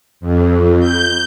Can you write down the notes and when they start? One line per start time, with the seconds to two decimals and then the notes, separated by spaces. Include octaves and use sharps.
0.20 F2
0.79 G6